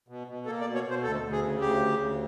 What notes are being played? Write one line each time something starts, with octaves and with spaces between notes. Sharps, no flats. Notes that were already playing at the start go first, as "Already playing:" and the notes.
B2
B2
A#3 A4
D5
B2
C#5
B2 C5
D2 A4
D2
G#4
C#3
D2 G4
C#3
D2